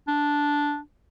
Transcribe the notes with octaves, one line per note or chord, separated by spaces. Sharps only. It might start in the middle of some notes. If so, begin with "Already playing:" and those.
D4